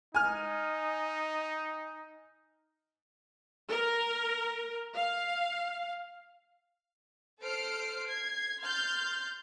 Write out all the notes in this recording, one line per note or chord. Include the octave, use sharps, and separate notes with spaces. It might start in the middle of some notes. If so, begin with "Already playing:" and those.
D#4 G#5 F6
A#4
F5
A4 C5 F6 C7 D7
G#6 C7
C6 F6 G6 A6